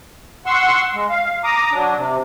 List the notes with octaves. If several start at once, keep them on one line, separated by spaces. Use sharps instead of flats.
F#5 C6 C#6 E6
G#3
F5
A#5 D6 D#6
F#3 D4
C3